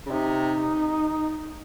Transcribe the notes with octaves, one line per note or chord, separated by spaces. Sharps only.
C#3
C3 D#4